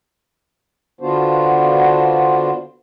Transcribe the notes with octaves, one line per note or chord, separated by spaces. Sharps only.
D3 B3 D4 F4 F#4 C5